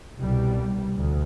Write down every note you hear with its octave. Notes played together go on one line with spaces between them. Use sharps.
C2 B2 G3
D2